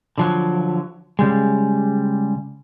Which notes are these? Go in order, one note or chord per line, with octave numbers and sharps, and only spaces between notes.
D3 F3 F#3
C#3 G3 G#3